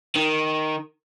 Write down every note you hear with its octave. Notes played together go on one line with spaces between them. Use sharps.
D#3